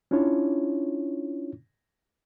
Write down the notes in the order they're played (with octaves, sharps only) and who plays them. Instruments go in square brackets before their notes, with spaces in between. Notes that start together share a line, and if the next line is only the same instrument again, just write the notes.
[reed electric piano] C#4 D4 E4 F4 C#5